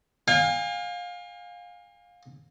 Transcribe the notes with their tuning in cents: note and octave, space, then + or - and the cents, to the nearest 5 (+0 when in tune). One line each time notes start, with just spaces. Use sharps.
F5 +25 G#5 -40